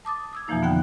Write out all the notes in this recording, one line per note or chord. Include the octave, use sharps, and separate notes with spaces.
A5 D6 D#6 A6
D#6 E6 G#6
F2 B2 E3 F3 A#3 D#4
D3 B3 F#5 G5 F#6